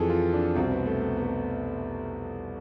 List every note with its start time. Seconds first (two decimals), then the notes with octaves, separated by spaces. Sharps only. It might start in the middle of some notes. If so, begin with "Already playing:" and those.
Already playing: F2 E3 G#4 A4
0.10 F4
0.33 D4
0.55 C2 B2 C4
0.71 B3
0.86 A3
1.01 A3
1.17 B3
1.24 A3